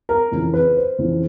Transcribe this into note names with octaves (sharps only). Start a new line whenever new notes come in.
A#4
F2 C#3 E3
B4
C5
F2 C#3 E3